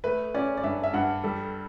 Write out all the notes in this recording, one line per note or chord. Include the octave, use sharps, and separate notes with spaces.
A3 B4
C#4 D5
D5
G2 E5
E5
G2 F#5
G3 A4